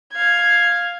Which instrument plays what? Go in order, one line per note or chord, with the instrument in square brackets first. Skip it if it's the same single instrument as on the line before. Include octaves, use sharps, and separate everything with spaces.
[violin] F5 G#6